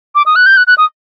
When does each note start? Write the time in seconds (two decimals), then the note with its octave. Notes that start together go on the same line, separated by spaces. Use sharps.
0.15 D6
0.26 D#6
0.36 F#6
0.46 G6
0.57 F#6
0.67 F#6
0.78 D#6